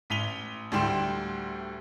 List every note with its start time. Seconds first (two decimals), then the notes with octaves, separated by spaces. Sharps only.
0.10 A1 B6 D#7 F7 G7
0.72 D2 A2 G3 G5 C6 E7